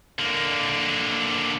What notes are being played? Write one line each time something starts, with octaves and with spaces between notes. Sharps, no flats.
D3 A#3